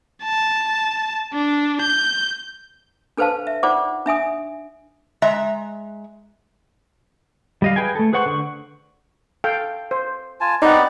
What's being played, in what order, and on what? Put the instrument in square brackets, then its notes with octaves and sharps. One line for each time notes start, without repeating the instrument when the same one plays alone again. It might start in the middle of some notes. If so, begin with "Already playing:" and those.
[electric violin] A5
D4
G6
[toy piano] D4 A4 B4 C5 F5 A5
E5
D#4 F4 C5 D5 F#5 D6
D4 E5 G#5 D#6
[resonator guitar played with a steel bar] G#3 E5 A#5
[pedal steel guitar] G3 D#5 F5
G#4 B4 G5 G#5
A3 A4
G#4 B4 C5 F#5 C#6
D3 C#6
[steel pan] A4 F5 G5
C5
[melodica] F4 G#5 A5
[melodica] B3 C4 G4 [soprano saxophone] D#4 [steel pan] D5 F#5